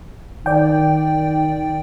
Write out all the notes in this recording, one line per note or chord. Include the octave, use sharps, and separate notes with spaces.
D#3 D5 G5